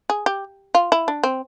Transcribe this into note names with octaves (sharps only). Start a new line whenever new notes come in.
G#4
G4
F4
E4
D4
C4